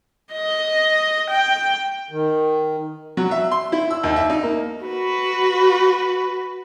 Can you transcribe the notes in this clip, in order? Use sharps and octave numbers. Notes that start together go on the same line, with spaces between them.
D#5
G5
D#3
F#3
E5
C6
E4
E6
D#2
E5
D#4
A#3
F#4 B4